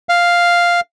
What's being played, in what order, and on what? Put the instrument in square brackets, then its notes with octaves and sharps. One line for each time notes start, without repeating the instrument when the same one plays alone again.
[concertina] F5